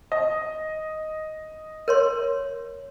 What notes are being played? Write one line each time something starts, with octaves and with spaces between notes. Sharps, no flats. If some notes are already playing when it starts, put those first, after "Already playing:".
D#5
A#4 C#5 C6